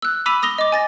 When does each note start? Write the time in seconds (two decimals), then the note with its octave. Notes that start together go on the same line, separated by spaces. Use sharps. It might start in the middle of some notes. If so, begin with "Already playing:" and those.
0.02 E6 F#6
0.26 B5 D6 E6 B6 D#7 F7
0.43 D#6 A#6 F7 G7
0.58 D#5 D6
0.72 G#5 A6 A#6